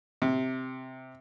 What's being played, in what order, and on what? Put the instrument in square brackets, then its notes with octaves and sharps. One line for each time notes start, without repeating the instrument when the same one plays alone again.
[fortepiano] C3